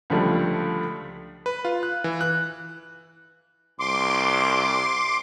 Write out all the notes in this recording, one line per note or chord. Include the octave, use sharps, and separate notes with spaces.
C#2 D3 F3 G3 A3
B4
F4
F#6
E3
F#6
C2 C6 D6